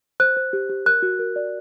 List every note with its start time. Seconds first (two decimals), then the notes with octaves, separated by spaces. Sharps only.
0.20 C5 F#6
0.37 C5
0.53 G4
0.69 G4
0.86 A#4 F#6
1.02 F#4
1.19 A#4
1.36 D5